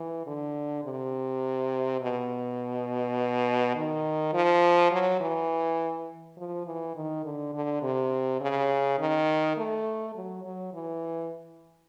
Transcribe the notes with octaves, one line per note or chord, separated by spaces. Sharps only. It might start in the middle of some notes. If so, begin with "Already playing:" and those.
Already playing: E3
D3
C3
B2
D#3
F3
F#3
E3
F3
E3
D#3
D3
D3
C3
C#3
D#3
A3
F#3
F#3
E3